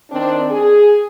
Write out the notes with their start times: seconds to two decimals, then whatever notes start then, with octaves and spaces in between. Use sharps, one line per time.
0.11 D#3 C4 D4
0.52 G#4